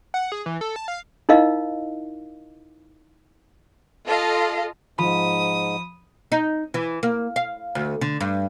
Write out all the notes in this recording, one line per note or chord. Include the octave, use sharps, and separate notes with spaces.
F#5
G#4
E3
A4
A5
F5
D#4 E4 A#4 D#5 F5
F4 A4 D#5 F5
G#2 F3 B5 D#6
D#4
E3
A#3
F5
D2
D3
G2